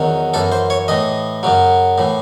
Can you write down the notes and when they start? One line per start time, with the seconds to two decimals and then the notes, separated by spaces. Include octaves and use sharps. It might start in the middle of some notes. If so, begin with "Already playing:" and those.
Already playing: E2 D#3 F#3
0.34 F#2 E3 A4
0.52 C5
0.70 C#5
0.88 A2 E3 D#5
1.43 F#2 C#3 F#3
1.98 A2 E3